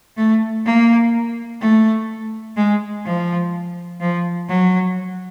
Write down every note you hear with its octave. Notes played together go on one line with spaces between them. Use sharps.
A3
A#3
A3
G#3
F3
F3
F#3